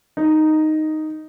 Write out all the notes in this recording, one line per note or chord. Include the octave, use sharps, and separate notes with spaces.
D#4